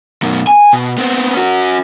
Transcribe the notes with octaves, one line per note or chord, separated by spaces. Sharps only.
F#2 B2
G#5
B2
B3 C4
C#4 F#4